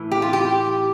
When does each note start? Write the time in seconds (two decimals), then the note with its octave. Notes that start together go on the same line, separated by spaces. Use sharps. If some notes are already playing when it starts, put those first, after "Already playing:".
Already playing: A2 E3
0.11 G4
0.22 F4
0.33 G4